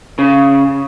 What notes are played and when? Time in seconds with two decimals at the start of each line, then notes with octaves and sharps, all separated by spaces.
0.19 C#3